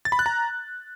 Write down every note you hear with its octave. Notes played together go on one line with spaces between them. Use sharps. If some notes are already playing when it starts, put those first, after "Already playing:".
A6
B5
F#6
A#5